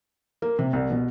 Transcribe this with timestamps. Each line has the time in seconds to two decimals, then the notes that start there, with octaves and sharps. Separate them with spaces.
0.42 A#3
0.59 C3
0.73 C2
0.91 B2